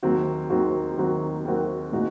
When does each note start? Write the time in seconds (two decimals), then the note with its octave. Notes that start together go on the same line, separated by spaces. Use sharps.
0.03 D#2 D#3 F#3 C4 F#4
0.50 D#2 D#3 F#3 C4 F#4
0.97 D#2 D#3 F#3 C4 F#4
1.45 D#2 D#3 F#3 C4 F#4
1.92 A#2 G#3 D#4 F#4